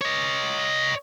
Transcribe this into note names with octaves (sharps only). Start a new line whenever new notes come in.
C#5 D#5